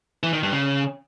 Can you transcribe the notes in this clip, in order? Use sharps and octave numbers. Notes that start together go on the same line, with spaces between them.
E3
D#3
G2
C#3